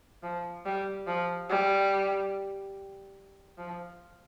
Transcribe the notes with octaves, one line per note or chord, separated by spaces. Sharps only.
F3
G3
F3
G3
F3